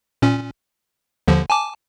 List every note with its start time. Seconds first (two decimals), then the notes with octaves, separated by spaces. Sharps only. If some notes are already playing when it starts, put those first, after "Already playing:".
0.22 A#2 C#4
1.28 D#2 D3 F3
1.50 G#5 A5 D6